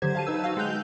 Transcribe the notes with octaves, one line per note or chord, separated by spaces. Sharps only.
D3 F#3 G4 C5 G#6
F5 A5 D#7
D#4 B4 E6
F#4 F5
G#3 G5 F#6 G6 F7